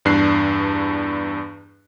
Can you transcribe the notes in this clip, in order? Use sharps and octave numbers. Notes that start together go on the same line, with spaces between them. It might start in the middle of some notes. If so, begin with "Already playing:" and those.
E2 G2 D4 F#6 C7